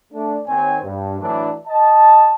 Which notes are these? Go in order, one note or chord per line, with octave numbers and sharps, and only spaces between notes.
A3 D4
D#2 C4 C#5 G#5
G2
A2 E3 F#3 D4
D#5 A5